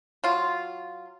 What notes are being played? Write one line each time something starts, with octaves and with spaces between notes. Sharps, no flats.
F#3 F4